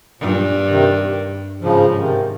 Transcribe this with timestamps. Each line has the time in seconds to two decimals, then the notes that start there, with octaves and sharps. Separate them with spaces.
0.20 G2 A#2
0.68 C3 D#3
1.61 G#2 C#3 F3
1.96 C3 D#3